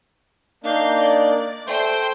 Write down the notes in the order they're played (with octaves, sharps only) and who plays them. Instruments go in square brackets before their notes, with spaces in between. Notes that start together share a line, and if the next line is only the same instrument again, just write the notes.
[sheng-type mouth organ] A#3 D4 D#4 [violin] F5 G6
[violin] D5
[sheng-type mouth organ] A3 C6 G6 [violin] C5 G5